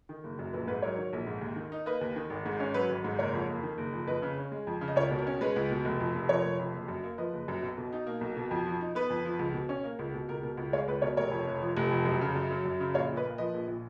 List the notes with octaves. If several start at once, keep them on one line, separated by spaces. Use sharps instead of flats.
D#3
F#1
F#2
A#1 B4
G#2 B4
F#3 A#4 C#5
D#3
A#1
G#2
D#2
D#3
D#4
A#3 B4 D#5
D#2
D#3
G#1
G#2
C#4
F#3 B4
G#1
G#2
F#1 A#4 C#5
F2
A#3
D#3
F#1
F2
F2 B4 D#5
C#3
C#4
G#3
F2
C#3
D#5
C#2 A#4 C#5
B2
A#4
C#4
G#3 B4
C#2
B2
F1
F2
F1
F3 A#4 C#5
F1
F2
F#1
F#2
A#3
F3 B4 D#5
F#1
F#2
B1
B2
D#4
A#3
B1
B2
F2
F3
D#4
B3 B4
F2
F3
C#2
B2
C#4
A#3
C#2
B2
C#2 A#4
B2 A#4
C#2
G#3 C#5 F5
C#2 B4
B2 A#4 C#5
F1 A#4 C#5
F2
F1
F3
F1
F2
F#2
C#3
F#2
F#3
F#2
C#3
A#1 C#5 F5
A#2
B4 D#5
A#3
F3 B4 D#5
A#1
A#2